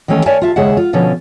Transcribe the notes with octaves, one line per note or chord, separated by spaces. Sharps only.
D#3 E3 F#3 A3 C#4
A#4 C#5 D5 E5 G#5 A5
F4 E5 A5
D#2 C#3 G#3 G#4 E5 F#5
F4
B2 D3 F3 C#4